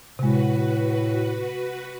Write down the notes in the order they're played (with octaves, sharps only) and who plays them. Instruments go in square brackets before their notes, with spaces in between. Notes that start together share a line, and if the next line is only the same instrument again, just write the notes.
[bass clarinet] A2 [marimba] C3 G#3 [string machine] F#4 B4